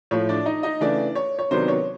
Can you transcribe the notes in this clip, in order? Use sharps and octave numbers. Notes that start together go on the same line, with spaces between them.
A2 F3 A3 C#5
D4 D5
D#4 D#5
D#4 D#5
C#3 E3 A3 D4 D5
C#5
C#5
C3 D#3 F#3 B3 D4 C5
C#5